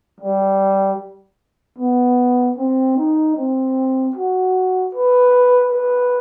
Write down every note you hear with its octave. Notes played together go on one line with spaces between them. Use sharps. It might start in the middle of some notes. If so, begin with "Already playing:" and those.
G3
B3
C4
D#4
C4
F#4
B4
B4